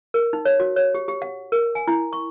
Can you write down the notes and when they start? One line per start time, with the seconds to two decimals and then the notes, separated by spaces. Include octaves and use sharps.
0.14 A#4
0.33 D#4
0.45 C#5
0.60 F#4
0.76 C#5
0.95 G4
1.08 G4
1.22 F#5
1.52 A#4
1.75 G#5
1.88 E4
2.13 C#6